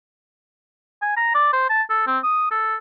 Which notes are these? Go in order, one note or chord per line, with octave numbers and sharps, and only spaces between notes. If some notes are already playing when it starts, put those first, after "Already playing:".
G#5
A#5
D5
C5
A5
A4
C4
D#6
A4